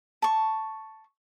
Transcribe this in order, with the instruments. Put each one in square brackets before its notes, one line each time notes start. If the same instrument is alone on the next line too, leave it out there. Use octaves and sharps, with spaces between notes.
[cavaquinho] A5 C#6